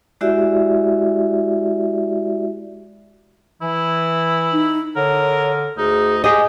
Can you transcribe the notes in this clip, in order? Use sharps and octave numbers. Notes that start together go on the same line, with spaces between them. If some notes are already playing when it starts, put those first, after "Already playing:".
G#3 E4 F#4 G4 D5 E5
E3 E4
D#4
D3 A#4 C#5
D2 D#4 G#4
G4 G#4 D#5 G#5